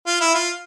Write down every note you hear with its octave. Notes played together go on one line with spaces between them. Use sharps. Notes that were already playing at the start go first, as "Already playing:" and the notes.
F4
E4
F4